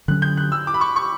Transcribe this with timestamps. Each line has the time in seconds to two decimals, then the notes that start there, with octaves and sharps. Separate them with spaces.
0.08 D3 F#3 C#4 F#6
0.22 G6
0.37 F#6
0.52 E6
0.67 D6
0.74 B5
0.81 C#6
0.96 C#6